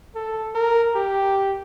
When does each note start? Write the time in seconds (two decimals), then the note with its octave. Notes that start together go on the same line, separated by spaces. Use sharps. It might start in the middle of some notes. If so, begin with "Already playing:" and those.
0.15 A4
0.55 A#4
0.95 G4